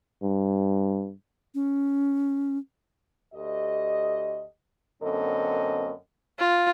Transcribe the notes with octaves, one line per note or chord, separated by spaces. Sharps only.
G2
C#4
D2 G4 A4 D#5
F#2 D3 A#3 C4 A4 D#5
F4